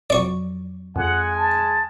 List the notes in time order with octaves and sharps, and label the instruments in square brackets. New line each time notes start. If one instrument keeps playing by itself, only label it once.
[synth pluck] F2 F#3 [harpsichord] D5 C#6
[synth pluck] F2 [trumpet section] G#3 G#5 [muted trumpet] F#5
[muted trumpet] A5